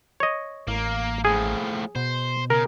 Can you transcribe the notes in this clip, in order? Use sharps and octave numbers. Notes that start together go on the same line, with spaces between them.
C#5 D#5
A1 A#3
A2 F3 G#4
B2 C5
C#3 A#4